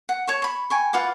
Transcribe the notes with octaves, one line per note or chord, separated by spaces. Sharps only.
F#5
C#5 A5 C#6
B5 C#6
G5 G#5 C#6
F4 B4 F#5 D6